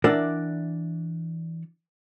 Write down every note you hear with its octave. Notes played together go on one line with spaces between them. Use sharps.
E3 D4 A#4 D5 E5 F#5